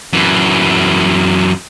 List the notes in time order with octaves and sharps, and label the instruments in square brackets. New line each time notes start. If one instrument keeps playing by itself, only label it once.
[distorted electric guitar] F#2 E3